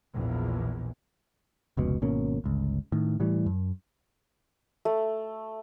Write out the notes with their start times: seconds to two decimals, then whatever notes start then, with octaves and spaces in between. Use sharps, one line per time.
0.13 A#1 E2 B2
1.77 F1 C#2 B2
2.02 G#1 B2 A#3 C#4
2.44 G1 C#2
2.92 A2 D#3
3.20 A2 E3 G3
3.46 F#2
4.85 A3